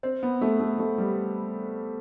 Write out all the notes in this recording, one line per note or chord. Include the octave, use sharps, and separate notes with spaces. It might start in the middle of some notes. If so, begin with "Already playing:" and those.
C4
B3
A3
A3
A3
G3